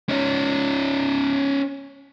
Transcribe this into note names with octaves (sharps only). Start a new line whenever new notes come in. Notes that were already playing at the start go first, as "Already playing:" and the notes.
C#4 D#4